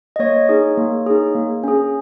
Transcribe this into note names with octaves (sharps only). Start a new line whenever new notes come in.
D#5
A#3 C#5
D#4 G#4
A#3
D#4 G#4
A#3
C#4 G#4